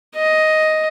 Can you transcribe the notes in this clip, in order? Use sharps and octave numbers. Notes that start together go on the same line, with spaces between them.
D#5